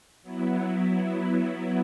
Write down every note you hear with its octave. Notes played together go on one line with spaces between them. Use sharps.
F#3 B3 E4